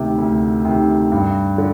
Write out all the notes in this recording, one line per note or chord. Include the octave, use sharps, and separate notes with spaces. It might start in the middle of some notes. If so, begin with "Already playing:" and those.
Already playing: D2 C3 D#3
D2
C3 D#3
G2
D3